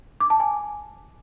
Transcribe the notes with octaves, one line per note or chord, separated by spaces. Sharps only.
D6
A5
G#5